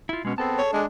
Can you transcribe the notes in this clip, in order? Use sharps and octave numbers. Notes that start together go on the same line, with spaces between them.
E4 F4
B2 G#3 C#4
B3 C4 G#4 A4 A5
C#5
G#3 D4